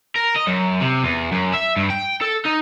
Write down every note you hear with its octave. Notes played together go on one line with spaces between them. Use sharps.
A#4
D#5
F#2
C3
E2
F#2
E5
G2
G5
A4
D#4